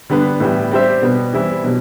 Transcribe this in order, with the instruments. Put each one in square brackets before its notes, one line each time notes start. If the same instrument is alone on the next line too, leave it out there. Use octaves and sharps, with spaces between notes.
[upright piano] D3 G3 B3
A2 E3 G3 B3
G3 C4 G4 C5 E5
B2 G3 B3
E3 G3 C4 E4
B2 F#3